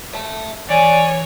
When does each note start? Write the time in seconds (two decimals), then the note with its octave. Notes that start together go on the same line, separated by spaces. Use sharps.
0.15 E5 A5
0.70 E3 C#5 D5 G#5